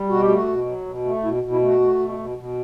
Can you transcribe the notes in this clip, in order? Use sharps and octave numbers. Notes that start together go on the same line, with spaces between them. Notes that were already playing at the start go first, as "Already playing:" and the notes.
Already playing: G3
B2 F#4
G4
A3 F#4
B2
F#3
B2
A3
B2 E4
B2
E4
A3 F#4
A3
B2
B2
B2